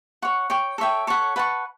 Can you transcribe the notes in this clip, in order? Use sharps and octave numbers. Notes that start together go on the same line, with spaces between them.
C#5 F#5 C#6
C#5 G5 D6
A4 C#5 E5 G5
A4 C#5 F#5 B5
B4 F#5 A5 C#6